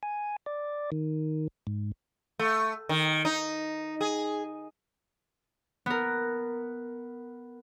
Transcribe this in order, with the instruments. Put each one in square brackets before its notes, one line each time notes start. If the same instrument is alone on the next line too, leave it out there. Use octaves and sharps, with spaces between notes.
[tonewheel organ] G#5
D5
D#3
G#2
[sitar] A3
D#3
D#4
G#4
[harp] B3 A#4